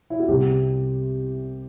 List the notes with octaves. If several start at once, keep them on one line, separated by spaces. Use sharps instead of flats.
E4
F#4
C2 C3 G3 G4